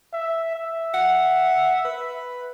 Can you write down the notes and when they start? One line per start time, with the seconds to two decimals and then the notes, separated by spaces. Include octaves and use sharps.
0.13 E5
0.56 E5
0.94 F#5
1.85 B4